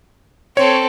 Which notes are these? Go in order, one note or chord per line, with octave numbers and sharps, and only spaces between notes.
C4 A4 C#5